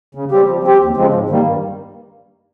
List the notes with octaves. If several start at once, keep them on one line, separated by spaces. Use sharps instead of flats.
C#3
G3 C4 G4
F3
C4 G4
D#2
C#3 F3 G#3 C4
G#2
D#3 G3 A#3
G2